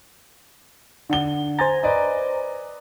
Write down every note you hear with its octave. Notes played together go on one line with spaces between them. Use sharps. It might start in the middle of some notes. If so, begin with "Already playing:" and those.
D3 F#5 G7
C5 G#5 A#5 A6
B4 D5 D#5